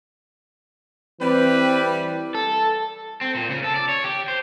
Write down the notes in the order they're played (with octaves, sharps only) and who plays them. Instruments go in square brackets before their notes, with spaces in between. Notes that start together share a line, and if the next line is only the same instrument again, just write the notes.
[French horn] E3 [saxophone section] G3 [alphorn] C4 [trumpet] B4
[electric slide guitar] A4
[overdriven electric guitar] C4
A#2
C#3
A4
D5
C#5
G4
C5